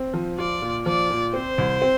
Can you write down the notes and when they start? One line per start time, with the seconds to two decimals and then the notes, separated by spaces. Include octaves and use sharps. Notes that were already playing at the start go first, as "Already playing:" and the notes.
Already playing: C4
0.14 F3
0.38 F4 D5
0.62 A#2
0.86 F3 D5
1.10 A#2
1.34 C4 C5
1.58 C2
1.82 C4